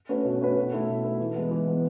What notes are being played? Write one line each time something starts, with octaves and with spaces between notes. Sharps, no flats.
A3 C#4 F#4 B4
B2
A3 C#4 F#4 B4
B2
A3 E4
B2
A3 E4
E3
G#3 B3
E3
G#3 B3